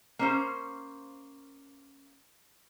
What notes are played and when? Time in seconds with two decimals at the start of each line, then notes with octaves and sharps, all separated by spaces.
0.19 A#3 C#4 C5